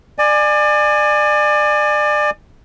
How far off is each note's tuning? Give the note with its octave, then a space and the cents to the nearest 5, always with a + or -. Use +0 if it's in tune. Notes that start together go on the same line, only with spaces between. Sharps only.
D5 +30 G#5 +0